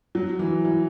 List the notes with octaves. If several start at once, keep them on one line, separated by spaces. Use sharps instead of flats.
F#3
E3
E3